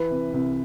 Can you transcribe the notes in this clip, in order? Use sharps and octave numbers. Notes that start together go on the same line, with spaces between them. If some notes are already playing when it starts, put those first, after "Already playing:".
Already playing: E3 B4
C3
C2